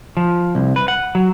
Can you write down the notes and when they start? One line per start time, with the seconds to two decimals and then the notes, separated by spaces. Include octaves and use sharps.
0.17 F3
0.55 C2
0.76 B4
0.88 F#5
1.15 F#3